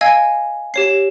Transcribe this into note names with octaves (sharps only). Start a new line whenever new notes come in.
D#5 F5 G#5 E6 G#6
G4 C#5 C7